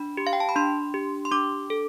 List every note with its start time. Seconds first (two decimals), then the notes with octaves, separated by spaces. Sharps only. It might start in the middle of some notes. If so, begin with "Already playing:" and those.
Already playing: D4 B5
0.17 G4
0.27 F5
0.33 G5
0.40 A5
0.49 B5
0.56 D4 C6
0.94 G4
1.25 C6
1.31 D4 D6
1.70 A4